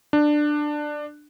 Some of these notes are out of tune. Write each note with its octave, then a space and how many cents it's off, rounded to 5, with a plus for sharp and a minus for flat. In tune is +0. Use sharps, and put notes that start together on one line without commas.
D4 +15